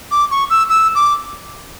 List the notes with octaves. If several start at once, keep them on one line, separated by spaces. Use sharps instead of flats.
D6
C#6
E6
E6
D6